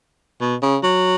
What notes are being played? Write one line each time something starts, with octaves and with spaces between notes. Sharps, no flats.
B2
C#3
F#3